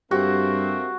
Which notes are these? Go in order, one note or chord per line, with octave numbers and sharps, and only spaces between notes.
G2 A3 A#3 C4 F#4 G4